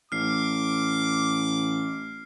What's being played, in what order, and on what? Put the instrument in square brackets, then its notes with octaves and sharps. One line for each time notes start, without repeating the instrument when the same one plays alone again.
[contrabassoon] A1 [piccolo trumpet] D6 [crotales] F6 C7